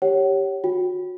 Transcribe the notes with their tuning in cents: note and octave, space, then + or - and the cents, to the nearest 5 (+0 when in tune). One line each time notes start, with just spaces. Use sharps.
G4 +0 C#5 +0 F#5 +35
F#4 -30 G5 +0